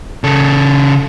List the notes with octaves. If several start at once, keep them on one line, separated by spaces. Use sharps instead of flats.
C#3 A4